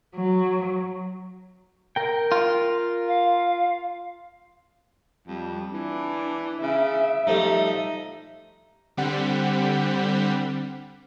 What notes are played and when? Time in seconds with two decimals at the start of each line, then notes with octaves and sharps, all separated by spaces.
0.16 F#3
1.96 A#4 G5
2.32 F4
3.08 F5
5.28 F2 G3
5.73 E3 D4
6.61 C#3 E5
7.27 F3 G3 A3 D#4
8.97 D3 G3 C4 F#5 G6 B6